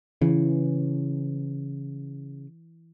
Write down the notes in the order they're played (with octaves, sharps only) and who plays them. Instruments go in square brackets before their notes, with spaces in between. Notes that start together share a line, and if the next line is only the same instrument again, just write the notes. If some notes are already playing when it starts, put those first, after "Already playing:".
[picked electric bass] C#3 [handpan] E3